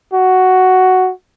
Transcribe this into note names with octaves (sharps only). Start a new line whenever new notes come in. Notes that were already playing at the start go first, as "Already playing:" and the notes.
F#4